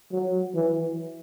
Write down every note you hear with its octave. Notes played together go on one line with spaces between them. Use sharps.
F#3
E3